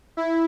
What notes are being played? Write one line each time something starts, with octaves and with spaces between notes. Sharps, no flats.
E4